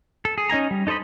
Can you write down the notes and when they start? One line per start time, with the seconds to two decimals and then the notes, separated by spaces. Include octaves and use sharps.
0.25 A4
0.38 G#4
0.50 C#4 D#4 G#5 A#5
0.71 G3
0.87 D#4 A4 C5 D#5 B5